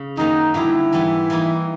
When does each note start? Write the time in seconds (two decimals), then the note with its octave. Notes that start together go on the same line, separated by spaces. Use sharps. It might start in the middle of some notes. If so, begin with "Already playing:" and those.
Already playing: C#3
0.17 F#2 D#3 F#3 A#3 D#4
0.54 G2 D3 F#3 A#3 E4
0.92 G#2 E3 G3 B3
1.30 E3 G3 A#3 D#4